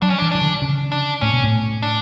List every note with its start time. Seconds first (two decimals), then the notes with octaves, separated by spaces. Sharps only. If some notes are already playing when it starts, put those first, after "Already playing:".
0.02 F#3 D4
0.10 C#4
0.18 E3 D4
0.32 E3 D4
0.42 D3
0.62 C#3
0.92 D4
1.21 A2 C#4
1.33 B2
1.44 A2
1.82 D4